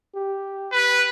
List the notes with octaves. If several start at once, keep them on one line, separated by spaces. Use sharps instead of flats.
G4
B4